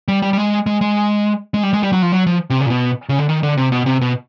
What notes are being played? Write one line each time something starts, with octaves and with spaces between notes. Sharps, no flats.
G3
G3
G3
G#3
G#3
G#3
G#3
G3
G#3
G3
F#3
F3
F#3
F3
C3
C#3
A#2
B2
C#3
D3
D#3
D3
C3
B2
C3
B2